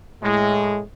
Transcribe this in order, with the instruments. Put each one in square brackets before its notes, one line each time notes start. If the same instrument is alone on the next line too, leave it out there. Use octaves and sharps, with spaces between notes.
[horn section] A2 G#3